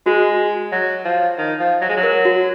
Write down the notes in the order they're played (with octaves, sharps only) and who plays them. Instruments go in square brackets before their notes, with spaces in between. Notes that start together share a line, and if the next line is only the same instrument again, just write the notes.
[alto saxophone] G#3 [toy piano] F#4
[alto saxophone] F#3
F3
D#3
F3
F#3
G#3
F#3
[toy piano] A#4
F#4